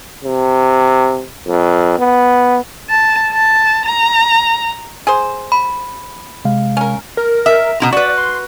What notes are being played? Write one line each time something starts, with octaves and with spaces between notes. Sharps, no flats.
C3
F2
B3
A5
A5
A#5
G#4 C5
B5
C3 G#3 F5
C#4 A#4
A#4
E5
B2 E4 A#5
F#4 B4 D5
C6